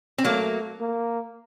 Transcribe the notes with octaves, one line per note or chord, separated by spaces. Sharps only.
C4
F#3 A3 A#3
A#3